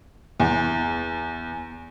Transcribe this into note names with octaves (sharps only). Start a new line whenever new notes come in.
E2